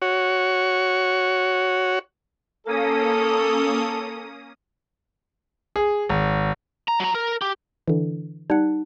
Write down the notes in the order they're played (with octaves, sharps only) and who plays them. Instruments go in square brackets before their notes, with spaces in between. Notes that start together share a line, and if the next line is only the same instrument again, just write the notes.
[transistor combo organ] F#4 C#5
[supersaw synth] A#3 C#4 D#6 [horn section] A4
[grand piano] G#4
G#1
[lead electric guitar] A#5
F#3 A#5
A#4
G4
[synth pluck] D3 E3
[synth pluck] G3 F#5 [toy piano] D#4